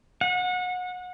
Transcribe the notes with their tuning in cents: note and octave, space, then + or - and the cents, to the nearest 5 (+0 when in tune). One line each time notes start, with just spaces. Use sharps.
F#5 -30